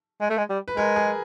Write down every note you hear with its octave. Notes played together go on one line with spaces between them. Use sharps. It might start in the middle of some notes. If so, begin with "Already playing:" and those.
G#3
A3
G#3
G3
B4
G#3 A#4
G#4